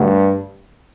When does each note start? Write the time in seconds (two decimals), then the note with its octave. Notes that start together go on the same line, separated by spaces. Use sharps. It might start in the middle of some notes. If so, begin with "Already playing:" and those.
Already playing: G2 D3 F#3 A3